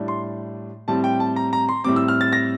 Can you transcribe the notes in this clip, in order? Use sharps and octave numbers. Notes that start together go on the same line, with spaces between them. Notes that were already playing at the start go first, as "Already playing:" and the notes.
Already playing: A2 G3 D4
C6
A2 G3 C4 A5
G5
A5
A#5
A#5
C6
A2 G3 C4 D6
E6
F6
A6
A#6